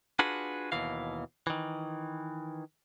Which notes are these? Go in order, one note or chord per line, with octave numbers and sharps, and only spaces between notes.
D4 F4 F#4 G#4 B4
D#2 B2 E3 F5
D#3 E3